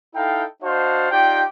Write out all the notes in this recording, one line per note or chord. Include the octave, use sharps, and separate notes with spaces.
D#4 E4 A4 F5 G5
D4 F#4 C5 D#5 F5 A5
D#4 F4 G4 D5 G5